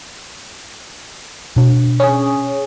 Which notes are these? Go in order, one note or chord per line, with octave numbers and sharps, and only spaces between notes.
B2 D4
C#4 G#4